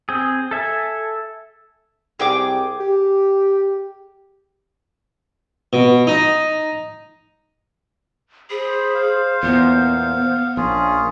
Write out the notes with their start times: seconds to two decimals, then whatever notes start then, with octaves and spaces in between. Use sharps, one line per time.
0.09 C4 G#4
0.51 A4 E5 G#5
2.20 C2 G#4 G5 D6
2.80 G4
5.73 B2
6.07 D#4
8.50 G#4 C5 B5
8.95 F5
9.43 E2 A#2 B3
10.57 A#1 C#4 F4 G#4